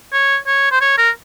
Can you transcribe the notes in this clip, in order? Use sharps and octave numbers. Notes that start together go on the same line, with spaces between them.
C#5
C#5
C5
C#5
A#4